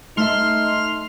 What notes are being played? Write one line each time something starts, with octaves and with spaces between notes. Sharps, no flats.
A3 D#4 E5 C6 F6